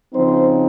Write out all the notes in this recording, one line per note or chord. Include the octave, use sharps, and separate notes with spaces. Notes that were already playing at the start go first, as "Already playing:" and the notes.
C#3 F3 C4 D#4 C5